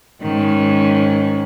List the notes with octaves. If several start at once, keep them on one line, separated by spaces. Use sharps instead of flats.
G#2 D#3 C#4